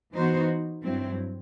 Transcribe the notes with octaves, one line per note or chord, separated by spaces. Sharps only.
E3 B3 D#4 F#4 C5
G2 F#3 C4 E4